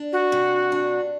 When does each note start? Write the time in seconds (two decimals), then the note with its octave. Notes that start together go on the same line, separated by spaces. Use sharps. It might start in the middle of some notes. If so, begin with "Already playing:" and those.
Already playing: D4
0.13 F#4
0.32 C3
0.72 D4